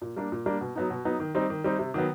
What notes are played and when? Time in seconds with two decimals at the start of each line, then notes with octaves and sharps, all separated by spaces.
0.02 A#2
0.16 G3 A#3 D4
0.32 A#2
0.46 G3 A#3 D4
0.61 B2
0.75 F#3 B3 D#4
0.90 B2
1.05 F#3 B3 D#4
1.20 D#3
1.35 G3 C4 D#4
1.50 D#3
1.64 G3 C4 D#4
1.79 C3
1.94 D#3 F#3 B3